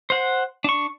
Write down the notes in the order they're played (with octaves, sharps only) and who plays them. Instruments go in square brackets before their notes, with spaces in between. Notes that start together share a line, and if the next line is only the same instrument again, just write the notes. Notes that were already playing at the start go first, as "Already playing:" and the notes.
[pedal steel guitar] C5 F#5
D4 C#6